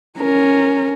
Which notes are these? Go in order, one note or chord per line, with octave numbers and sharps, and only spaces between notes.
C#4 A#4